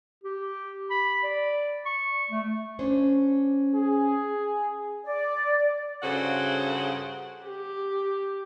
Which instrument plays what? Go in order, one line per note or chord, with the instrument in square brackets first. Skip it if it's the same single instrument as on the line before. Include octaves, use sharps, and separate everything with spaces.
[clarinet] G4
B5
D5
C#6
A3
[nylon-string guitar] C#4 D4 C5
[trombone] G#4
[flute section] D5
[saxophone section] G2 C#3 F#4 A4 C5 F#5
[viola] G4